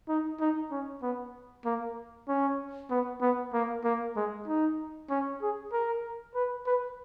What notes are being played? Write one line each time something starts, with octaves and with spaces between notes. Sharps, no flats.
D#4
D#4
C#4
B3
A#3
C#4
B3
B3
A#3
A#3
G#3
D#4
C#4
G#4
A#4
B4
B4